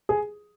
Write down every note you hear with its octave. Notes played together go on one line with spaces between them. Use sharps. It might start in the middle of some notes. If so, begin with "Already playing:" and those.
G#4